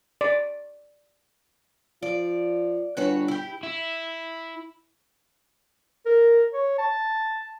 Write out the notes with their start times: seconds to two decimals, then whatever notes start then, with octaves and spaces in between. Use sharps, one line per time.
0.21 D5
2.03 F3 D5
2.97 G1 F#4 B4 C#5
3.28 E4 G4
3.63 E4
6.06 A#4
6.53 C#5
6.78 A5